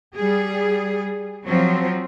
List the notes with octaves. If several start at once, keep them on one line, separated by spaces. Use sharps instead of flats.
G3 G#4
F3 F#3 C4